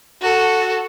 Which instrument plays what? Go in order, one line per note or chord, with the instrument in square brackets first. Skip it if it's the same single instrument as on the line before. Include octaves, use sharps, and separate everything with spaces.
[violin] F#4 A4